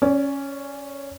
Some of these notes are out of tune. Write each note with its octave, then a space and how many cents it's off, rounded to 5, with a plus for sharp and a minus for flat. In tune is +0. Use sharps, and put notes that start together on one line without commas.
C#4 +0 D5 -30